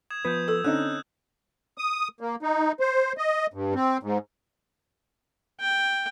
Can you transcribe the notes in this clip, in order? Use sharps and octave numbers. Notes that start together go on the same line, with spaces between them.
D#6 G#6 E7
F3 B3 B4 D#6 G6
A4 E6
D3 C4 C#4 D#4 F#6
D#6
A#3
D#4
C5
D#5
G2
C4
G#2
G5